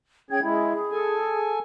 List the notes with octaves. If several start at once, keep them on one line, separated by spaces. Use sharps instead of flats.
C#4 G#4 G5 G#6
G#3 E4 G#4
A4 G#5